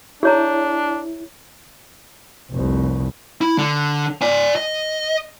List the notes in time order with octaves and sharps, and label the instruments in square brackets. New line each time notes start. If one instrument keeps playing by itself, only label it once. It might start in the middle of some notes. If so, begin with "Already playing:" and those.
[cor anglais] D4 [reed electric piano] E4 [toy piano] G#4 C#5 A#5
[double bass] F1 C2
[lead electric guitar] E4
D3
D5 G#5
D#5